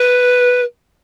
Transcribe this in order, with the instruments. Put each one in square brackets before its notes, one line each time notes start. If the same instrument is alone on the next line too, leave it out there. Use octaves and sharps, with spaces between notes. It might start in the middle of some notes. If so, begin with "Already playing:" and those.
Already playing: [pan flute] B4